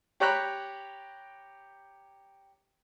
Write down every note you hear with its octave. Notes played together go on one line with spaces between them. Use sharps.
G4 C#5 G5 A#5 B5 F#6